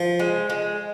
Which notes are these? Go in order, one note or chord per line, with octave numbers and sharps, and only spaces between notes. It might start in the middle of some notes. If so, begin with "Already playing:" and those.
Already playing: F3
G#3
G#3